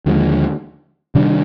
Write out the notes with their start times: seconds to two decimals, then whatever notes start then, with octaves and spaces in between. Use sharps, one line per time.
0.06 D#2 D3 F3 G#3
1.15 C3 D#3 G3 D4